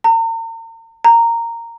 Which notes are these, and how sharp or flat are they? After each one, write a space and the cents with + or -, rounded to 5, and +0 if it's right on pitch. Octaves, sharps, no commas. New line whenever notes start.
A#5 -40
A#5 -10